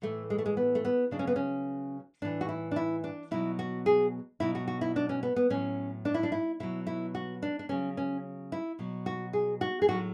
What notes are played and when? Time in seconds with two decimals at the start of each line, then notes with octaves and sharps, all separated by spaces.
0.02 A2 E3 A3
0.30 G#3
0.38 A3
0.46 G#3
0.57 B3
0.75 A3
0.85 B3
1.11 C#3 F#3 D4
1.19 C#4
1.27 B3
1.36 C#4
2.22 A2 E3 D4
2.41 F#4
2.49 E4
2.71 D4
2.76 E4
3.04 D4
3.31 B2 F#3 E4
3.59 F#4
3.86 G#4
4.40 B2 F#3 E4
4.55 F#4
4.67 F#4
4.81 E4
4.96 D4
5.09 C#4
5.23 B3
5.36 B3
5.50 A2 F#3 C#4
6.05 D4
6.14 E4
6.23 D4
6.32 E4
6.60 B2 F#3 E4
6.87 E4
7.15 F#4
7.42 D4
7.59 D4
7.69 C#3 F#3 C#4
7.97 C#4
8.52 E4
8.79 B2 F#3
9.06 F#4
9.33 G#4
9.61 F#4
9.82 G#4
9.88 A2 F#3 F#4